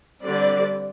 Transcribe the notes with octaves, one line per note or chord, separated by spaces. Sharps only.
D3 G3 C4 D5